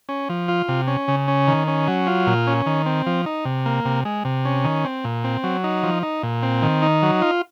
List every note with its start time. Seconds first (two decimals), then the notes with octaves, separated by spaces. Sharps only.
0.09 C#4
0.29 F3
0.48 F4
0.68 C3
0.87 C#4
1.08 C#3
1.28 C#4
1.48 D#3
1.68 C#4
1.87 F#3
2.07 F4
2.27 A#2
2.47 C#4
2.66 D#3
2.86 C4
3.06 F3
3.26 D#4
3.45 C3
3.66 A#3
3.85 C3
4.05 G#3
4.25 C3
4.45 C#4
4.64 D#3
4.85 C4
5.04 A#2
5.24 C4
5.44 F#3
5.64 D#4
5.83 F3
6.03 D#4
6.23 A#2
6.43 C4
6.62 D#3
6.82 D#4
7.02 F#3
7.22 F4